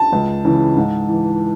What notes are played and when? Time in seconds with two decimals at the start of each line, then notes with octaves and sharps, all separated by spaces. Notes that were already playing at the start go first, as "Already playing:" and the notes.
Already playing: A5
0.12 C#2
0.45 C#3 E3
0.77 G#2
1.09 E3